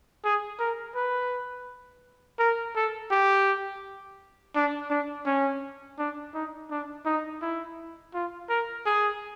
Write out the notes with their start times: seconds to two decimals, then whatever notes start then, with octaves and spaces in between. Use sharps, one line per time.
0.25 G#4
0.59 A#4
0.95 B4
2.39 A#4
2.76 A4
3.11 G4
4.56 D4
4.90 D4
5.26 C#4
5.99 D4
6.34 D#4
6.71 D4
7.06 D#4
7.42 E4
8.14 F4
8.49 A#4
8.86 G#4